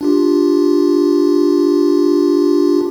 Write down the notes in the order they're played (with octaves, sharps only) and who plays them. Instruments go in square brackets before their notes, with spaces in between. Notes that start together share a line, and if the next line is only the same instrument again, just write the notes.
[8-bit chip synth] D4 F4 G4